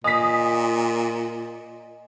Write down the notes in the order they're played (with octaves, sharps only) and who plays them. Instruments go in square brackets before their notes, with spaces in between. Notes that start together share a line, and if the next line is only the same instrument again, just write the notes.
[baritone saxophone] A#2 [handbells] D#5 G#5 [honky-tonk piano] D#6 B6